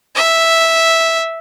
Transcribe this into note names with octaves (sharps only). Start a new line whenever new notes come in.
E5